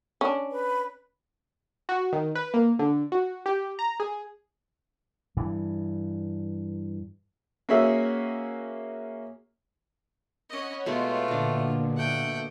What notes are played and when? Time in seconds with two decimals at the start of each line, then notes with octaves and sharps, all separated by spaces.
0.21 C#4 D4
0.51 B4
1.89 F#4
2.13 D#3
2.35 B4
2.54 A#3
2.79 D3
3.12 F#4
3.46 G4
3.79 A#5
4.00 G#4
5.37 G2 E3
7.69 A#3 C#4 F#4 G#4 E5
10.50 C#4 C#5 D#5 F#5 B5
10.86 B2 G#3 A3 F4
11.28 A#2 D3 D4 F#4
11.97 A3 F#5 G5